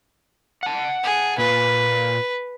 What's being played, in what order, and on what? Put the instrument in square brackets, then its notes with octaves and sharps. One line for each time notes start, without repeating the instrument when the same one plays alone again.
[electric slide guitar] F#5 A5
[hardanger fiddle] G#4
[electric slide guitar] A#2 A#3 F4 [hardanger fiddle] B4